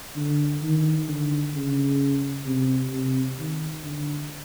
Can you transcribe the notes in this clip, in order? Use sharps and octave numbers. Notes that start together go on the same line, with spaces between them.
D3
D#3
D3
C#3
C3
C3
D#3
D3